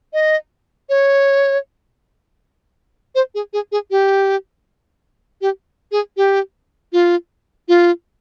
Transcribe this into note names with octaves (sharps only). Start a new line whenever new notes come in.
D#5
C#5
C5
G#4
G#4
G#4
G4
G4
G#4
G4
F4
F4